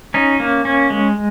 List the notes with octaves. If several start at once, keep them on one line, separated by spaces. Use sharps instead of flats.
C#4 D#4
A#3
C#4
G#3